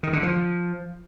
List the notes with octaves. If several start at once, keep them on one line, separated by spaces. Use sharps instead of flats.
D#3
D3
F3